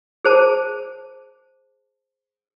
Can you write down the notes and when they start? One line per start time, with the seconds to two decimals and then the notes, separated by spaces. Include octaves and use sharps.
0.25 G#4 C5 A5 D6